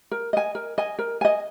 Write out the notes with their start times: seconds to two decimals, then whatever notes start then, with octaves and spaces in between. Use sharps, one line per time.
0.11 A#4
0.33 D#5 G#5
0.55 A#4
0.78 D#5 G#5
0.99 A#4
1.21 D#5 G#5